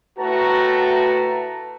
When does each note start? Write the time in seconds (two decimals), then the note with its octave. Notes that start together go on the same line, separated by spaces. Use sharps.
0.19 A2 A3 F#4 B4 A5 A#5